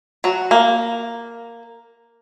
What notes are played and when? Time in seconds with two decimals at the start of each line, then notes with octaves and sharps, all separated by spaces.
0.24 F#3 F#4
0.51 A#3